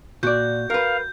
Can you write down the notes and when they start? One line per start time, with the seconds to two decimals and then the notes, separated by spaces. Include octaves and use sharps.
0.23 A#2 F#4 D5 G6
0.70 A#4 B4 F5